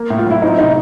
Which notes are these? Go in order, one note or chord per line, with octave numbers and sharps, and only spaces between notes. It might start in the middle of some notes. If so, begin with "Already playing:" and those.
Already playing: A#3
A2
F4
F#3 E4
C4 D#4
C3 D#4